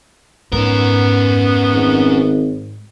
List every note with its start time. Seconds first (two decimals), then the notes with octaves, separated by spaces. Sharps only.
0.52 G#2 B3 C#4 A#4
1.72 G#1